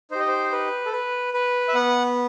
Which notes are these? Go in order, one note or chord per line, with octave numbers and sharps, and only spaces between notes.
D#4 G4 C5 D#5
C5
B4
A4
B4
B4
E5
B3 F#5